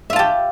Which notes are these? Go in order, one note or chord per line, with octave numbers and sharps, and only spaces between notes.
F4 G4 E5 A5